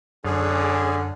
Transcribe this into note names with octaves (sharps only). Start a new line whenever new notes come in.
F#2 D3 C#4 G#4